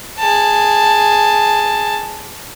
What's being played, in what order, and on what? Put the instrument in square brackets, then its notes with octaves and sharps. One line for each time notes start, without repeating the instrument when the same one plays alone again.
[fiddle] G#4 A5